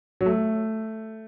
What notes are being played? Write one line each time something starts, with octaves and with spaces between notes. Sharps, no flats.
F#3
A3